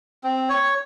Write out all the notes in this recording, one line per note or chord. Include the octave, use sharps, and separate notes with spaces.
C4
C#5